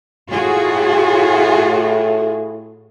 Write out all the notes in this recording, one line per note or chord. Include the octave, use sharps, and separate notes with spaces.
A2 F4 F#4 G#4